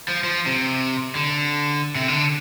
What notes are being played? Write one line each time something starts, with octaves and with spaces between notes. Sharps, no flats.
F3
F3
C3
D3
C3
D3